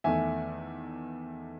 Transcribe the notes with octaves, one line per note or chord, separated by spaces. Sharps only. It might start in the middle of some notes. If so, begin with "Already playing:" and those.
E2 D#3 A3 E5 G#5